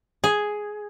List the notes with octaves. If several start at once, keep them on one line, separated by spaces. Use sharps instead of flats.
G#4